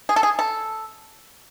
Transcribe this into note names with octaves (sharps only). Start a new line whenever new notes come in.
G#4
A4
G#4
A4